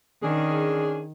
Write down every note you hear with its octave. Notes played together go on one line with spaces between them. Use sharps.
D#3 C#4 D4 G#4